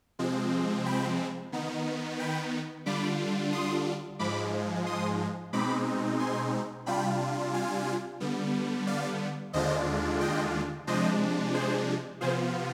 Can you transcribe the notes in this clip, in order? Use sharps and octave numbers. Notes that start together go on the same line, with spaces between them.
C3 F3 G#3 C4
G5 B5
D#3 B3 D#4
G5 B5
D3 G3 D4 F4 B5 D6
C6 D#6
G#2 F3 G#3 B5 D6
C6 D#6
B2 G#3 C4 D#4 B5 D6
G#5 C6
C3 G3 D4 F4 G5 B5
F5 G#5
D3 G3 B3
D5 F5
D#2 D3 G#3 D4 F4 C5 D#5
D#5 G5
C3 F3 G#3 D4 C5 D#5
G#4 C5
C3 F3 B3 F4 G#4 C5